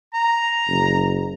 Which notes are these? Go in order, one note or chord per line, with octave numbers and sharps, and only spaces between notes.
A#5
F#1